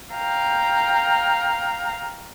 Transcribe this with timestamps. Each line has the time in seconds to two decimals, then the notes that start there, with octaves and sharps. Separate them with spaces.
0.14 F5 G5 A#5